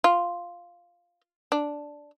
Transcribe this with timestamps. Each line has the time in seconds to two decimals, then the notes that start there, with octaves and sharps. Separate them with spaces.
0.04 F4
1.52 D4